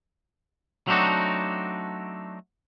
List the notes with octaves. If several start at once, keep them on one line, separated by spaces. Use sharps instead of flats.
F#3 A3 C4 D4 D#4 F#4